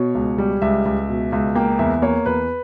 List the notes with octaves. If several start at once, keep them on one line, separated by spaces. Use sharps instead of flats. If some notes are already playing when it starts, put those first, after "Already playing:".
Already playing: B2 C#5
C#2
G3
C#2 E5
C#2
B2
C#2
A#3 G5
E2 E5
A#3 C#5
E2 B4